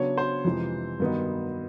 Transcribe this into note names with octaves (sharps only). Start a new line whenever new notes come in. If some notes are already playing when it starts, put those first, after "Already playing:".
Already playing: C#3 F#3 B3 D4 C#5
C5
F2 C3 E3 G#3
G2 D#3 F#3 B3 D#4